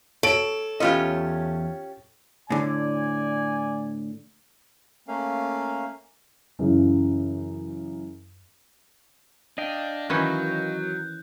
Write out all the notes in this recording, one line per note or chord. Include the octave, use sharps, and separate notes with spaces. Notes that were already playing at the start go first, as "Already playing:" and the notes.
A4 C#5 D7 F#7
E2 C#4 F4 G4 B4 D#5
A2 D3 D5 G#5
A3 A#3 C#4 F5
F#2 C#3 E3
D4 D#5 F5 G5
D#3 E3 F#3 C#4 F#6 G6